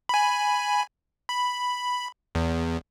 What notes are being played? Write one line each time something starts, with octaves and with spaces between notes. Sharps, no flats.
G#5 B5
B5
E2